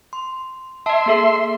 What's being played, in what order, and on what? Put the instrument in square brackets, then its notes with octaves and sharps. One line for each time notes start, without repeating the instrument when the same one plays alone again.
[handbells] C6
[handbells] D#5 A5 [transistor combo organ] E5 C6
[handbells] A#3 G#4 A4